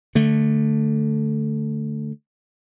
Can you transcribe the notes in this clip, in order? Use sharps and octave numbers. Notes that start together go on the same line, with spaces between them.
D3 A3